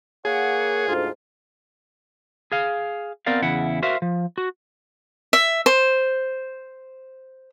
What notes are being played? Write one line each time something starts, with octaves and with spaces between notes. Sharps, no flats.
A#3 G#4 C#5 F#5
D2 G#2 F4
G#4 F5
B3 C4 A#4 D5 F5
E2 C#3 E4 F#5
F#4 A#4 C5 E5 F5
F3
F#4
E5
C5